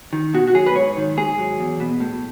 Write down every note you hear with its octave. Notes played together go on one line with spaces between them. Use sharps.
D#3
B2 F#4
F#4
F#3 G#4
B4
G#2 C#5
D#3
G#2 G#4
F#3
E2
B2
A2